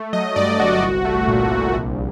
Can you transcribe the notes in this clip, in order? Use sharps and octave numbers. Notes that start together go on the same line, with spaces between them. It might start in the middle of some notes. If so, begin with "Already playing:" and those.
Already playing: A3
F#3 D#5
G2 D5
G1 F#4
C2
A3
A#2
C2
A#1